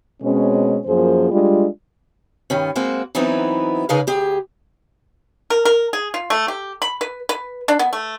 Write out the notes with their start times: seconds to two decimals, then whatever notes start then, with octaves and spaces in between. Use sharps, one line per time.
0.22 B2 G#3 C4 C#4
0.86 F#2 F3 A#3 G#4 C5
1.31 G3 G#3 D4 F4
2.50 G2 D#3 C#4
2.76 G#3 A#3 C4 F#4
3.15 E3 F#3 B3 C4 D#4 E4
3.89 C#3 D#4 G#4 A#4 B4 F5
4.07 D2 G4 G#4
5.50 A#4
5.65 A#4
5.93 G#4
6.14 F4
6.30 A3
6.48 G4
6.82 B5
7.01 B4
7.29 B4
7.68 D4
7.79 B3
7.93 A3